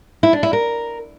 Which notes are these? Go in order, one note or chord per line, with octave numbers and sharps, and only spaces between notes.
E4
D4
E4
A#4